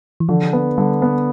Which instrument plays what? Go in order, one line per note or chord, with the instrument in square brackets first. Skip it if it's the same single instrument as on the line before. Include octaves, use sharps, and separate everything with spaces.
[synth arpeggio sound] E3
[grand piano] D3 [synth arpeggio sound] F3
[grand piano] B3
[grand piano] D3 [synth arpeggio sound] G3
[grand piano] B3